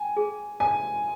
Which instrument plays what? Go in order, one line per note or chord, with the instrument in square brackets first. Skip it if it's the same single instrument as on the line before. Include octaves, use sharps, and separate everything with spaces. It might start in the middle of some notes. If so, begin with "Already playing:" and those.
Already playing: [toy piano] G5 [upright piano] G#5
[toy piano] G#4
[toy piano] D5 [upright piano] G#5